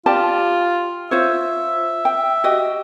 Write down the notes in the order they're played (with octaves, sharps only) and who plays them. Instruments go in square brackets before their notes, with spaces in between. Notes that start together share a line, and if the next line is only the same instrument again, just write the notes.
[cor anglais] F4 [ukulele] G4 D5 A5
[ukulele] F4 C5 C#5 [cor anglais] E5
[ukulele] G5
F#4 G4 D#5